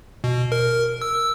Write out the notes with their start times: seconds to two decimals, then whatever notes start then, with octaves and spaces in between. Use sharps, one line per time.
0.24 B2
0.52 A#4
1.02 E6